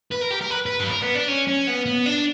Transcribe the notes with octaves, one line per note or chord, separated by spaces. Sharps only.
B4
A#4
G4
A#4
B4
B4
G4
A#4
B3
D4
C#4
C#4
B3
B3
D4